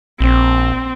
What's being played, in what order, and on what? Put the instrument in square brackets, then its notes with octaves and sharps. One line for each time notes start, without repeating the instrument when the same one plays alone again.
[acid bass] A#1 [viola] C4